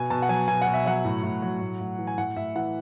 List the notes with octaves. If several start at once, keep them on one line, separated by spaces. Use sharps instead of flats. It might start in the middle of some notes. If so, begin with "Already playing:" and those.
Already playing: B2 G#5
B2 A5
F#5
F#3 G#5
B2 G#5
F#5
B2
E5
F#3 F#5
A2
A2
F#3
A2
A2
E3
G#5
A2 F#5
A2 E5
E3 F#5